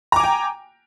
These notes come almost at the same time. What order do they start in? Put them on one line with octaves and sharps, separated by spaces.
A#5 D6 G#5 G5